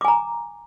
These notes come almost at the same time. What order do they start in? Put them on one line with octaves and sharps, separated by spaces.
D6 G#5 A#5